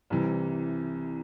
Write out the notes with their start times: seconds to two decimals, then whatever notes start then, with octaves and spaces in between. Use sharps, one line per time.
0.10 C2 C3 E3